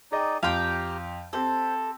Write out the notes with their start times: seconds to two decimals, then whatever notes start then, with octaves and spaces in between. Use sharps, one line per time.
0.12 D#4 G#4 D5 D#5 G5
0.43 F2 G4 F5 G5 A#5 C6
1.33 C4 G4 A4 C5